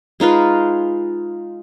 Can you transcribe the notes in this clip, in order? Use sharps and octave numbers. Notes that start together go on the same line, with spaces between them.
G#3 D#4 F4 B4